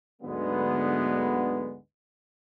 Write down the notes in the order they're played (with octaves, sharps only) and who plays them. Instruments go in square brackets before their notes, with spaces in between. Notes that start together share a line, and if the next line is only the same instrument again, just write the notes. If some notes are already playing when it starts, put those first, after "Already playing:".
[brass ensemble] D2 G#2 D3 F#3 G#3 B3